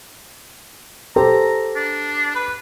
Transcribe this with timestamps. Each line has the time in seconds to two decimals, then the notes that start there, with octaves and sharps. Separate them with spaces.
1.16 G4 A4 C5 A#5
1.76 D4
2.35 B4